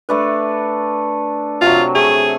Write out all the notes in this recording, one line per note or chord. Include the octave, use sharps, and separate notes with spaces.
A3 D4 B4
C3 F#3 F4
A3 G#4